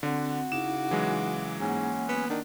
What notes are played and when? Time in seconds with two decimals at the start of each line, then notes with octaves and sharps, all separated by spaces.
0.03 D3 C4 F#4
0.52 C#3 D#4 E4 D6 E7
0.91 E3 F#3 G#3
1.60 G#2 A#3 C#4 F#5
2.09 B3
2.30 D#3 D4